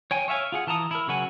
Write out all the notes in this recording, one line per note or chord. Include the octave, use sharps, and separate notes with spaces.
C#5 G5 G#5
C#5 E5 F5 G#5
F4 G#4 F#5
E3 A5 A#5 D#6
E4 A#4
C#3 F#3 C#5 F#5 G#5